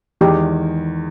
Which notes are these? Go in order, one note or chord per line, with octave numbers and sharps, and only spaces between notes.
E2 D#3 G#3 G4